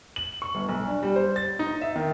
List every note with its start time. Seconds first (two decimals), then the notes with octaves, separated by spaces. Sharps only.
0.16 F#7
0.42 C#6
0.55 G1
0.69 B1
0.88 D4
1.03 G3
1.16 C5
1.36 A6
1.59 D#4
1.82 E5
1.96 D#3